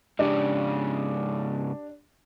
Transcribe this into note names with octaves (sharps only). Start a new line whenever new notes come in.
G#2 C#3 D4 G4